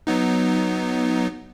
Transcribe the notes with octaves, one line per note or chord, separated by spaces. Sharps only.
F#3 B3 D#4